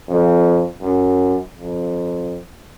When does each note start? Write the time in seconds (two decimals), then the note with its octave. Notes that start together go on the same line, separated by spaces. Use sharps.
0.09 F2
0.82 F#2
1.57 F2